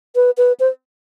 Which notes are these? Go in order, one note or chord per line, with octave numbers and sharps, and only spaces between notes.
B4
B4
C5